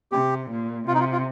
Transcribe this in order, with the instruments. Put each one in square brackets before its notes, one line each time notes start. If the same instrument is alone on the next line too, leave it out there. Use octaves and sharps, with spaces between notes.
[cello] C3 [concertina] G4
[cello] A#2
[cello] C3 [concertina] F4
[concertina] D#4
F4
F4